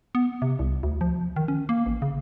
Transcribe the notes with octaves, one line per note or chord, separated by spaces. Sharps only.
B3
C3
C2
D2
F3
D#3
C#4
A#3
A1
C#3